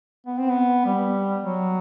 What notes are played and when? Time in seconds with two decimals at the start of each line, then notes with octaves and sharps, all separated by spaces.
0.27 B3
0.38 C4
0.50 B3
0.86 G3
1.44 F#3